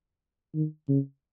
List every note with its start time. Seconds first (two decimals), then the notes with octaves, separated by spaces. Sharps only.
0.54 D#3
0.88 C#3